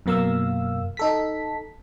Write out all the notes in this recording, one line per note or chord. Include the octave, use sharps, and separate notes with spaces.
F#2 B2 A#3 F5 E6
D#4 A4 B6